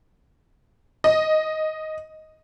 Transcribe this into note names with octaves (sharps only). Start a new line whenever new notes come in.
D#5